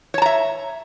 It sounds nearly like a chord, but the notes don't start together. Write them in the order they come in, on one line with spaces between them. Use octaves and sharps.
C#5 A5 A#5 E5